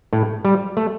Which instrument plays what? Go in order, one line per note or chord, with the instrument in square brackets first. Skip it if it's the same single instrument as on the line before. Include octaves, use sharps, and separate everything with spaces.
[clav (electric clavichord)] A2
G3
A3